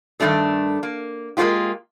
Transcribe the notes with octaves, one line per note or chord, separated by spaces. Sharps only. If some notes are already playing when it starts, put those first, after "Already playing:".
G2 D#3 G#3 A3 D4 A4
A#3
G#3 A#3 B3 C#4 F4 G4